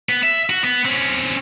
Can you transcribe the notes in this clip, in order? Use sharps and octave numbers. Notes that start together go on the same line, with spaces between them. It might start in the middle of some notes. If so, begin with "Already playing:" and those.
B3
E5
F#4
B3
C4 C#4